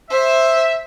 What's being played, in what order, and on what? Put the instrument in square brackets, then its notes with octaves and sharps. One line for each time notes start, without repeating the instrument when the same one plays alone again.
[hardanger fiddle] C5 [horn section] E5